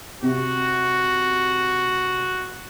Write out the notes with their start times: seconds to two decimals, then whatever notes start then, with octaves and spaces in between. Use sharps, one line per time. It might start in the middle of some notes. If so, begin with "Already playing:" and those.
0.22 C3 F#4